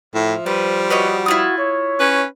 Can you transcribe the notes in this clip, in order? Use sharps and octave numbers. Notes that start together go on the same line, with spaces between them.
A2 F3 E5
G3 B4 C5
F#4 B4 C#5 D#5
E4 F4 D#6
C#5
C#4 B4